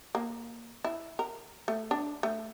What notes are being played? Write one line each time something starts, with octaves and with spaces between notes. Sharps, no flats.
A#3
E4
A#4
A3
D4
A3